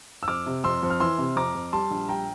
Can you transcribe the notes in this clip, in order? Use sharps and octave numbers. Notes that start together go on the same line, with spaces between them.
E6
F2 D6 F6
C3
F2 C6 E6
F2
F6
E3 C6 E6
C3
F2 A#5 D6
F2
G3 A5 C6
A#1
G3 G5 A#5